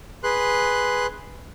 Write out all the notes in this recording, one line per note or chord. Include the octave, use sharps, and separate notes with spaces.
G#4 B4 C6 F#6